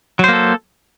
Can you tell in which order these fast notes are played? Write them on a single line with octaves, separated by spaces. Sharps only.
F#3 C5 A#3 A4